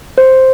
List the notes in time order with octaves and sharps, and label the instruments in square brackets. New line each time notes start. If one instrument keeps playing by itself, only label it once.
[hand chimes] C5